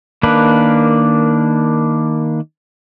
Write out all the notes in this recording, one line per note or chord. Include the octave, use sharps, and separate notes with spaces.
D#3 A#3 D4 B4